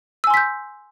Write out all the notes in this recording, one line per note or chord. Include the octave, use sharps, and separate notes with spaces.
G#5 C6 E6 G6 B6